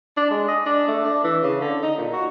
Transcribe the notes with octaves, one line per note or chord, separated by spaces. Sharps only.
D4
G#3
D#5
D4
A3
D4
E3
C#3
D3
D#4
A#2
F#4